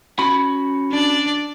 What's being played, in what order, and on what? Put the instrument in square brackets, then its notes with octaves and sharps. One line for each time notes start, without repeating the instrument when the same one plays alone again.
[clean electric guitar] C#4 F#4 B5
[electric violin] D4 D5